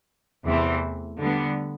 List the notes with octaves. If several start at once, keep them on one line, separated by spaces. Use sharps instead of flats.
E2 C3 E3 A3 C4
D3 G3 B3